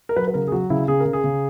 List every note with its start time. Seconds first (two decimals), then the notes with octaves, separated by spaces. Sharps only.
0.09 A#4
0.16 F#3 B4
0.28 B4
0.34 C#3 A#4
0.48 G#4
0.52 F#3 F#4
0.70 C#3 E4
0.88 C#3 G#4
1.00 A#4
1.05 C#3
1.13 G#4
1.24 C#3